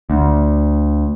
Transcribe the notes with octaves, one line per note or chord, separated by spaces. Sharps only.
D2